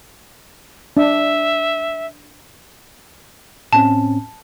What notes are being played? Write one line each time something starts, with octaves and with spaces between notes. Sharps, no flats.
D4 E5
A2 C4 C#4 A5